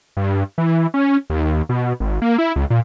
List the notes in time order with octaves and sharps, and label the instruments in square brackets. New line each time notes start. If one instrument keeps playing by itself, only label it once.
[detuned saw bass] G2
E3
C#4
D#2
B2
G#1
A#3
E4
C#2
A#2